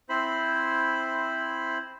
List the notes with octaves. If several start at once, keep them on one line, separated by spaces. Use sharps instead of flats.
C4 E4 C5 B5